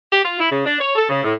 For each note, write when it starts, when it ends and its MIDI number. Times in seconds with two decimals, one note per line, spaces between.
0.12 0.23 67
0.24 0.36 65
0.39 0.50 64
0.51 0.62 49
0.66 0.78 62
0.80 0.92 73
0.96 1.05 69
1.09 1.23 49
1.23 1.33 45